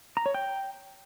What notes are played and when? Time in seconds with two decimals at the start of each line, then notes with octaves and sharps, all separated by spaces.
0.17 A#5
0.26 C#5
0.34 G5